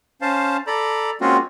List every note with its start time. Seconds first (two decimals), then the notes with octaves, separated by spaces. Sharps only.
0.21 C#4 C5 F5 A5
0.67 A4 D5 A#5 B5
1.21 G#3 A#3 C4 C#4 F4 F#4